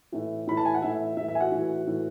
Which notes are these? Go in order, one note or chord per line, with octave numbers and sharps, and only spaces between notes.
A2 E3
A2 E3 B5
A5
G#5
F#5
A2 E3 E5
A2 E3 E5
E5
G#5
F#4 F#5
A2 E3
A2 E3